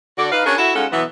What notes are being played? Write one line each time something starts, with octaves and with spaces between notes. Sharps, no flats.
D3 F#4 A4 D5
D#4 B4 F5
C#4 D4 F#4 G#4 A#4
E4 F#4 A4 E5
G#3 C#4 D#4 F4 A4 F#5
B2 E3 F#3 B3